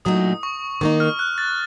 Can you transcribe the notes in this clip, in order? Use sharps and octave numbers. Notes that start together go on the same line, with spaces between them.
A#2 F#3 A3 D#4 D#6
C#6
D#3 A#3 D#4 C#6
F6
F#6
A6